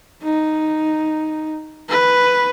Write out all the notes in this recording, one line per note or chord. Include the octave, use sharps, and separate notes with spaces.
D#4
B4